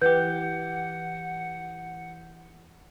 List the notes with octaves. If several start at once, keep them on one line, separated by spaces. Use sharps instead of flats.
E3 G4 B4 F#5 G6